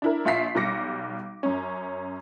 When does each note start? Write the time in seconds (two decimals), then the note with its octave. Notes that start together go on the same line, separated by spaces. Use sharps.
0.02 D4 E4 A#4
0.25 A#1 F4 E5 B6 C7
0.55 B1 G3 D6 A#6 C#7
1.43 F#2 C#4